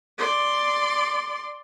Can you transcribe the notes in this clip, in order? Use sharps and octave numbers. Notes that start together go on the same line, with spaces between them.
D5 C6